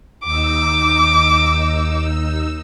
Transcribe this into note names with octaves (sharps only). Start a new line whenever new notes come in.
D#2 D#4 D6 E6